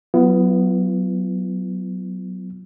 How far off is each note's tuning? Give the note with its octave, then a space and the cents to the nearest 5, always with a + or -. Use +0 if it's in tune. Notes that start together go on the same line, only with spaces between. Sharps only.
F#3 +0 B3 +10 F4 -45